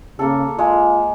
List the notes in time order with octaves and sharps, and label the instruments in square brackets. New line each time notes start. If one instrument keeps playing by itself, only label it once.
[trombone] C#3 [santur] A#3 A4
[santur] G#3 [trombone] F4